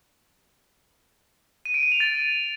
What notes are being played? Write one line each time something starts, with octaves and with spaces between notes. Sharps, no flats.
D#7
D7
D#7
F7
A6